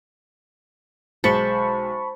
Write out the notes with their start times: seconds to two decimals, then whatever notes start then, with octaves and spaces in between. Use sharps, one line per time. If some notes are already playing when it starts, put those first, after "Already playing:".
1.24 B1 G#3 C5 A5 B5 C#6 C#7